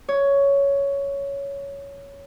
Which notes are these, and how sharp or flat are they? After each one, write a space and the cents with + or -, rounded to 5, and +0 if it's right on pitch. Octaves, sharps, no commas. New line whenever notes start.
C#5 +10